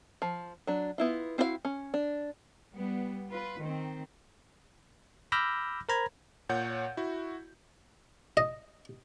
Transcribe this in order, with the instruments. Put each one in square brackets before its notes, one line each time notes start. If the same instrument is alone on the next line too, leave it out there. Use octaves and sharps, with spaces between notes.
[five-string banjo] F3
F#3 D4
B3 E4 F4
C4 E4 F#4 A#4 F5
C#4
D4
[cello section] G3 B3
F4 B4
D#3 C4
[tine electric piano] B5 D6 E6 F6 G6 A#6
A#4 C5 A#5 B5 G#6
[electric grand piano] A#2 C#5 F#5 G6
E4 F#4
[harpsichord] D#5